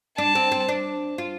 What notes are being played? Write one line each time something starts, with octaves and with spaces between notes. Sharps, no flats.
D4 A5
C4
C4
D4
F4